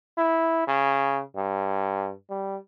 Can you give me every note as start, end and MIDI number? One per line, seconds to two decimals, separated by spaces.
0.18 0.64 64
0.67 1.21 49
1.36 2.11 43
2.30 2.57 55